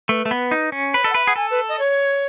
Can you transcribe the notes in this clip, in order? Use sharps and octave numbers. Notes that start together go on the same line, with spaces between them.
A3 B4
A3
B3
D#4
C#4
B4 C#5
A4 D#5
F#5
B4 E5
G#4 F#5
A4 G#5
B4
D#5
C#5